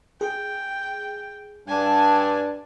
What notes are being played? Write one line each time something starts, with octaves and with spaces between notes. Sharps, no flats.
G#4 G5
G2 D4 G#5 A5